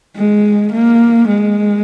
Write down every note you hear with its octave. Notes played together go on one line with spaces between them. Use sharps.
G#3
A#3
G#3